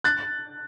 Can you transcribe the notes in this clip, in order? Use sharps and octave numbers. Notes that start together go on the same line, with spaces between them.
F#6 A6